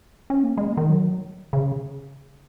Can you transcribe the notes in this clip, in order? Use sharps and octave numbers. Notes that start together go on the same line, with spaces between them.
C#4
A#3
G#3
D#3
F#3
C#3